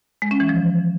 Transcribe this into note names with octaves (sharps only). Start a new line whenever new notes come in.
G#3
C#4
E3
F3